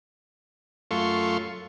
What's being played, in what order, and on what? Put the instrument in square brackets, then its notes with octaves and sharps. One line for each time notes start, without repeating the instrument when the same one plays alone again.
[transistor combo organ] F#2 A3 F4 C6 C#6